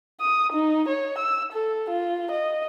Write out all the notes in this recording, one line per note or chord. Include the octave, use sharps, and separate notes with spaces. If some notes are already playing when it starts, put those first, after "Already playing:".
D#6
D#4
C#5
E6
A4
F4
D#5